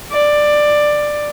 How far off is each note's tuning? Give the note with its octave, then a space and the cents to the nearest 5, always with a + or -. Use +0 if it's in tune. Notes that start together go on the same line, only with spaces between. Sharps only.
D5 +10